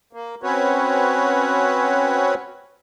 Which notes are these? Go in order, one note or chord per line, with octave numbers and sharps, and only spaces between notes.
A#3
C4 C#4 F#4 B4 C#5